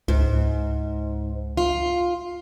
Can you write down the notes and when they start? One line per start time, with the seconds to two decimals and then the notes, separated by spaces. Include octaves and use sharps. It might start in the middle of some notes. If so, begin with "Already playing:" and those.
0.08 C#2 G#2
1.57 F4